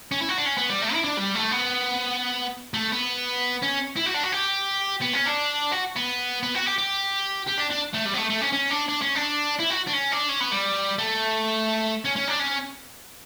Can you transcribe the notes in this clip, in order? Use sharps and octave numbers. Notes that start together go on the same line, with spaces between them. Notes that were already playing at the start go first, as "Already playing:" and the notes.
C#4
E4
F#4
D4
C#4
B3
G3
A3
E4
D4
G3
A3
B3
A3
B3
C#4
E4
F#4
D4
F#4
G4
B3
C#4
D4
F#4
B3
B3
F#4
G4
G4
G4
D4
D4
A3
G3
B3
A3
A3
C#4
C#4
D4
D4
C#4
D4
E4
F#4
D4
C#4
D4
C#4
B3
G3
A3
C#4
C#4
D4
C#4